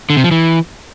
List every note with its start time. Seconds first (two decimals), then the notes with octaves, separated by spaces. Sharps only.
0.10 D3
0.17 C3
0.24 F3
0.31 E3